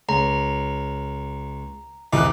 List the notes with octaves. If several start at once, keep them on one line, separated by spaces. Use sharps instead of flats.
C#2 A#5
C2 F2 E3 D#4 D6 F#6